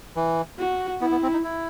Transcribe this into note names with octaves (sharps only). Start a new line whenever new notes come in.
E3
F#4
B3 E4
B3
C4
D#4
E4